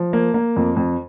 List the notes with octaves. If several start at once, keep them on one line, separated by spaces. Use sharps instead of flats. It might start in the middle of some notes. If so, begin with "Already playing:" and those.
Already playing: F3
A#3
A#3
F2
F2